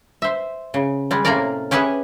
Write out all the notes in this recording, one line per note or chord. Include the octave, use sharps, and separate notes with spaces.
C5 E5
C#3
G3 G#3
A2 C3 A#3 C#4 A#4 D5
C#4 G4 G#4 B4 E5